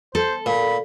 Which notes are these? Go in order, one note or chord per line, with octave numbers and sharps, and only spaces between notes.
A4 C5
A#2 B5